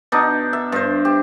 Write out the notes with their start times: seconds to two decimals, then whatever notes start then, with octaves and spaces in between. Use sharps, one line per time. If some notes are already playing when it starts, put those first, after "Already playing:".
0.12 B2 D4 D#4
0.53 E5
0.72 G2 C5
1.05 G4